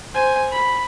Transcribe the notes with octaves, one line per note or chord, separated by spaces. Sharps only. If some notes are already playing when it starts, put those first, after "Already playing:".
C5 G#5
B5